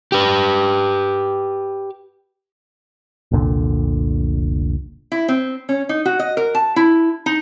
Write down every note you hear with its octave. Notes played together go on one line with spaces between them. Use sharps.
G4 B4
F1 C2 A#2 D3
E4
C4
C#4
D#4
F#4
D#5
A#4
A5
E4
D#4